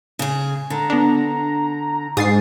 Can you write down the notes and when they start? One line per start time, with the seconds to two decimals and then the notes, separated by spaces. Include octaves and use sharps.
0.19 C#3 G#4
0.70 D3 A#5
0.90 B3 D4
2.17 G#2 G#4 D#6 A6 C7